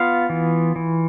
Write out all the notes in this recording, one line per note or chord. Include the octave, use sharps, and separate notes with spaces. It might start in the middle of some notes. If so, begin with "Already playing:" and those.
Already playing: B3 F4 F5
E3
E3